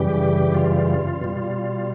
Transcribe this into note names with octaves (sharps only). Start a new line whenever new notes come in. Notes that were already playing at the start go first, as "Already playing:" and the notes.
Already playing: F#2 C#3 E3 G3 G4
F4
B2 G3